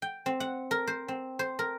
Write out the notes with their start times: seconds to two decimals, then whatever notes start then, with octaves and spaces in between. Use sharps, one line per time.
0.02 G5
0.26 C4
0.40 F#5
0.71 A#4
0.87 C5
1.08 C4
1.39 C5
1.59 A#4